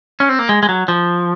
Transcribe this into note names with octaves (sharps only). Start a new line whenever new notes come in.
C#4
C4
A#3
G#3
G#3
F#3
F3